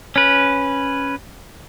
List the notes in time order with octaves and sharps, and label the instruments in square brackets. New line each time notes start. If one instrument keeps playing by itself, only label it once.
[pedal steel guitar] C#4 B4